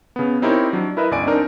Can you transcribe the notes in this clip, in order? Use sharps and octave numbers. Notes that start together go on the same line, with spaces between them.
C#3 B3
C4 D#4 E4 G4 A#4 C#5
F#3 D4
E4 A#4 B4 D#5 E5
G1 C#2 D5 G#5 D7
C4 D4 D#4 A#4